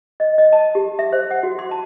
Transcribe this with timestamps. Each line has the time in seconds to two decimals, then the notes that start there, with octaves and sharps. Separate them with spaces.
0.20 D#5
0.38 D#5
0.53 A5
0.75 G4
0.99 E5
1.13 C5
1.31 F#5
1.43 F#4
1.59 C6
1.71 A5